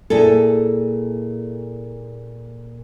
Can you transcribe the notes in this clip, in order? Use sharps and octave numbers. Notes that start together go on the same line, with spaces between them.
A#2 E4 G#4 A4